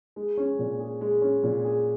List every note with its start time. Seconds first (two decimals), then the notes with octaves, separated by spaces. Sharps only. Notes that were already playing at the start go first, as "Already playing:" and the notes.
0.16 G#3
0.37 C#4
0.59 A#2
0.80 G#4
1.01 G#3
1.22 C#4
1.43 A#2
1.65 G#4